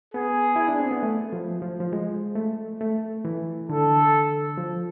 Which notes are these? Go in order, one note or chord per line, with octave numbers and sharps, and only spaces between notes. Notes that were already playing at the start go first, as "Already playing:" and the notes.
B3 G#4
E4
D4
C4
B3
A3
F3
F3
F3
G#3
A3
A3
E3
D3 A4
F3